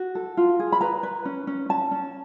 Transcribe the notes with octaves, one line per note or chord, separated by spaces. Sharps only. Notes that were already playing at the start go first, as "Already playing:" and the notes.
Already playing: F#4
A4
F4
G#4
B5
B4 A#5
B4
C#4
C#4
C#4 A5
C#4